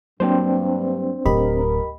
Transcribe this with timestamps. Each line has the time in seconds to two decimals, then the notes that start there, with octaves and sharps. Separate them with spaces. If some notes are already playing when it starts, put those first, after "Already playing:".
0.20 G2 F#3 A#3 C4 D4 C5
1.26 D1 G4 A#4 D#5 B5